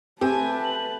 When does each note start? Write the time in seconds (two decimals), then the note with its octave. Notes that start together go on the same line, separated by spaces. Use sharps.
0.21 A3 C4 G4 B4 G#5 A5
0.64 F#7